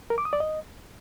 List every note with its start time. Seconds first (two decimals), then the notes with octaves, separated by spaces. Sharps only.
0.10 A#4
0.18 D6
0.25 D#6
0.33 D5
0.40 D#5